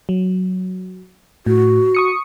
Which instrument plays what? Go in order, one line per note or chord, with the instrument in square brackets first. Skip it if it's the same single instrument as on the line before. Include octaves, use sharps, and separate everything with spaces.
[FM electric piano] F#3
[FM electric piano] A2 [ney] F#4
[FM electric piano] C#6 D#6 C#7